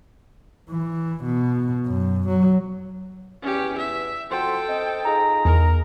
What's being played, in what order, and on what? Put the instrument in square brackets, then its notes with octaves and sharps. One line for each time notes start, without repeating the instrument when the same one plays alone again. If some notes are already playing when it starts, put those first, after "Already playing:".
[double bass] E3
B2
F#2
F#3
[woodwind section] E2 [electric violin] C#4 G4
[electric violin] E5
[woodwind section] F2 F#4 C6 [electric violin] A4 G5
[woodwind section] C4 D#5
[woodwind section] D#4 F4 G#4 [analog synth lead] A#5
[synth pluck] E2 [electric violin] A#4